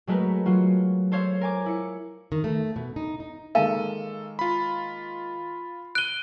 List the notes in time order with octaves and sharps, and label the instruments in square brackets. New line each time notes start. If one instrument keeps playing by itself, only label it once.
[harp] F#3 G#3 A3 F#4 A#4 B4
F#3 F4 F#4
A4 C5 C#5 F5
A#4 G#5 D6
E4 C#7
[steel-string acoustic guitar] D#3
A3
B2
D#4
D#4
[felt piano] D#3 G#3 A#3 [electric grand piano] A4 [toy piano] F5 A5
[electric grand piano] F4 B5
[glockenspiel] F#6 G7 [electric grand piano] D7 D#7